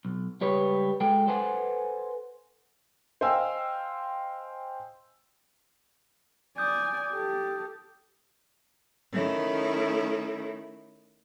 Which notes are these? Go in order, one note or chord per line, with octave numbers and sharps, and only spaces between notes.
B1
C#2 G3 B4 C#5
G#3 A4 G5
A4 B4 C5 F#5 G#5
C5 D#5 F5 G5 G#5 E6
D5 G#5 D#6 G6
G4 A4
D#3 A3 C#4 E4